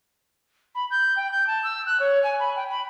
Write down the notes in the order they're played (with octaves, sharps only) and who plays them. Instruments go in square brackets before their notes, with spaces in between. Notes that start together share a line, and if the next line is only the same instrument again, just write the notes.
[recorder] B5
G6
G5
G6
A5
E6
F#6
C#5
G#5
B5
G5
B5